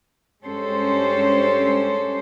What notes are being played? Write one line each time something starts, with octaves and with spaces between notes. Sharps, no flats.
G2 G#3 C#4 G4 A4 C5